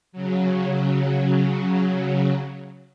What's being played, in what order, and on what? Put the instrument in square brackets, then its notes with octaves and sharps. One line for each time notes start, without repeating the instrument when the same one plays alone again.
[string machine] C#3 F#3